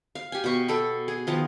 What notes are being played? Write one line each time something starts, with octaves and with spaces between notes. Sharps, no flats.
F5
G4 G#5
B2 C#6
A4 B5
G#4
D#3 F3 B3